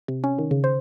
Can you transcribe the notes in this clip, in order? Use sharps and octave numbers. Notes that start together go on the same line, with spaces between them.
C3
C#4
D#3
C#3
C5